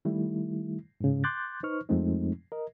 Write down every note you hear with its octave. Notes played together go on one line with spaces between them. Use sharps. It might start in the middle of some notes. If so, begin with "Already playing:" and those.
D#3 G3 A3 E4
G#2 C#3
C6 D6 F#6 G6 A6
D#4 B4 C5 C#6 F6
F2 F3 G#3 A3 C4 D#4
A#4 D#5